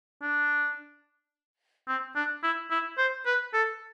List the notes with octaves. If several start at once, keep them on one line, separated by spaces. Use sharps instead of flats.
D4
C4
D4
E4
E4
C5
B4
A4